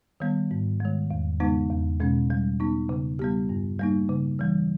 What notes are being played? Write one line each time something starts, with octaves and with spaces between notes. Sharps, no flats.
D#3 G3 B3
G#2
D#3 G#3
E2
C#3 G#3 B3 D#4
E2
B2 G#3 C#4
G3
B3 D#4
C#3
G3 B3 G4
G2
G3 A#3 D#4
C#3
E3 G3